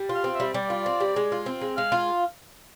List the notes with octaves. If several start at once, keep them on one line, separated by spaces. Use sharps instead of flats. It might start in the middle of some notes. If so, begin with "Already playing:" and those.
Already playing: G3
F4
F5
C4
E5
G3
G3 D5
F4
C4
G3
G#3
F4
C4
G#3
G#3 F5
F4